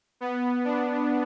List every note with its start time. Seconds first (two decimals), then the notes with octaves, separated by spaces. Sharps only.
0.21 B3
0.65 D4